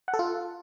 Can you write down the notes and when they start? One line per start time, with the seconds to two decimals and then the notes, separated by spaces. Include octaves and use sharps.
0.08 F#5
0.14 A4
0.19 F4